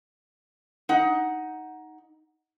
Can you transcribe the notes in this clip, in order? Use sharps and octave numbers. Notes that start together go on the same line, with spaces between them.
D#4 F#5